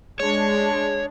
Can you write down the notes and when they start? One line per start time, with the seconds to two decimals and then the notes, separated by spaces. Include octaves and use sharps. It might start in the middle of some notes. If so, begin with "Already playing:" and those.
0.20 G#3 D4 C#5